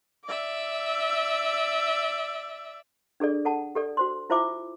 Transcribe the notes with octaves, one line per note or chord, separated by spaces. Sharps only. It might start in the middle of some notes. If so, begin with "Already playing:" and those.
D5 E5
D4 G#4 A4 D5
A4 F#5 A5
G4 A4 D5
F#4 C5 C6
E4 F4 C5 E5 G#5 D6